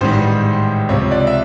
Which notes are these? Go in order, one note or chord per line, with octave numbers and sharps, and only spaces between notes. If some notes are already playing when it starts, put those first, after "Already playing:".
A1 G#2 D#3 G3 C5
C#2 C3 F3 C#5
D5
E5